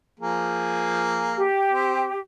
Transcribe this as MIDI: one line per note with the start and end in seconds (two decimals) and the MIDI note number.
0.20 1.45 53
0.20 1.45 58
0.20 1.45 68
1.38 2.19 67
1.72 2.07 60